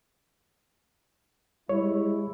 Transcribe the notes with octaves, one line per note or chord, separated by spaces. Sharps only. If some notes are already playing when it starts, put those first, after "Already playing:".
G3 G#3 E4 C#5